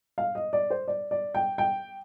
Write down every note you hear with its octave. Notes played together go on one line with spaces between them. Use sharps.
F5
D#5
D5
C5
D5
D5
G5
G5